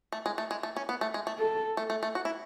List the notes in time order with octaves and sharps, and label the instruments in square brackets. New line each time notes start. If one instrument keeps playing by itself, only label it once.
[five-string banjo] A3
G#3
A3
G#3
A3
C#4
B3
A3
G#3
A3
[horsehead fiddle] A4
[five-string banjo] A3
A3
A3
F#4
E4